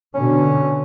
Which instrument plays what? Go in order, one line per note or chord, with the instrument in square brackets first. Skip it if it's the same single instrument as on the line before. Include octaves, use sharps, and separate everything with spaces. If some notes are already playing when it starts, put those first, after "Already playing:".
[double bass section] B2 D3 [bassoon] C#4